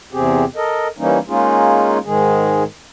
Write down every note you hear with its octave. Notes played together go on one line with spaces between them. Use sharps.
E2 C3 C4 G4 G#4
A4 A#4 D#5
E3 G3 A#3 C#4 D#4
G#3 A#3 C#4 D#4 F4 G#4
G#2 D#3 G#3 G#4